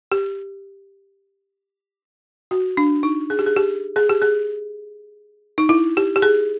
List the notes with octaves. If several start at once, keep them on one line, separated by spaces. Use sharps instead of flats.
G4
F#4
D4
D#4
G#4
G4
G#4
G4
G#4
G4
G#4
D#4
E4
G4
G4
G#4